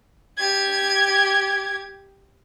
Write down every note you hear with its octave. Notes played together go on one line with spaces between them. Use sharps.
G4 G#6